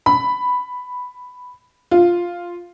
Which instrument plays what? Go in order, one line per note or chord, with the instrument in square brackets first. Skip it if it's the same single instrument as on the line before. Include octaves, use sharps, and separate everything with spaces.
[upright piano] B5
F4